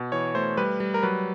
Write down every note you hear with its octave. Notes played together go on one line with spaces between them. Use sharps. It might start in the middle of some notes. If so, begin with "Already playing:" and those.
Already playing: B2
E3 C#5
A3 C5
G3 B4
G3
A#4
F#3 B4